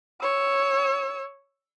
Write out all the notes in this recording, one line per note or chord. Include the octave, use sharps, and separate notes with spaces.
C#5 E6